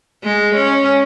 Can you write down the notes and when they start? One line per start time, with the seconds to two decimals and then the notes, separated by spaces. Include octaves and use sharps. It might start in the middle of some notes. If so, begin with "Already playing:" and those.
0.24 G#3
0.55 C#4